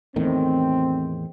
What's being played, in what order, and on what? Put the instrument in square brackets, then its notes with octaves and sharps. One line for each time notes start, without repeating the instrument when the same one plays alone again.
[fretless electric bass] E2 A2 D#3 [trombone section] C4